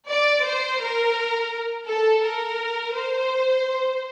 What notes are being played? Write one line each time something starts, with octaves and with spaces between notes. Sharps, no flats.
D5
C5
A#4
A4
A#4
C5